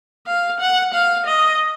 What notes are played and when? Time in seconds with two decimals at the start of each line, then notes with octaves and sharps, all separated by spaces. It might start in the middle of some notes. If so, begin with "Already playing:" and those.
0.27 F5
0.60 F#5
0.94 F5
1.26 D#5